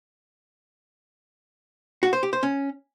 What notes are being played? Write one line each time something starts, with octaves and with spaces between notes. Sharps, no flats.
F#4
C5
G4
C5
C#4